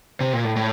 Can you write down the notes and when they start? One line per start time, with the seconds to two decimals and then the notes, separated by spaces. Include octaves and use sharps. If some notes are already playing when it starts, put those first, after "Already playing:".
0.20 C3
0.33 A#2
0.44 A2
0.56 A2